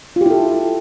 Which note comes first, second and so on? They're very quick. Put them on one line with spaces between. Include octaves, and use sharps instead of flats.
F4 G4 E4 A4